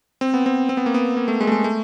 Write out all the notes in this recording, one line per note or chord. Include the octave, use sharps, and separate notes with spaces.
C4
B3
C4
C4
B3
A#3
B3
A#3
A3
G#3
A3
G#3
A3